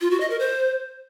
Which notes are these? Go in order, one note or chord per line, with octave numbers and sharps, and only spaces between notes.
F4
F#4
D#5
A#4
C5